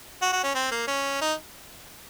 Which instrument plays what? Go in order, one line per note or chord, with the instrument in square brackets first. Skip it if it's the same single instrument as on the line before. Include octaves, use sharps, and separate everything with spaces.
[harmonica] F#4
F#4
C#4
C4
A#3
C#4
D#4